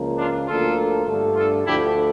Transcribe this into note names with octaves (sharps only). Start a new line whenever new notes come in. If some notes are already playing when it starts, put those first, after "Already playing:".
Already playing: C#2 C#3 F3 A#3
D4 F4
D2 D3 F3 A#3 F4 A4
G2 D3 A3
F4 A4
D2 D3 F3 A3 E4 G4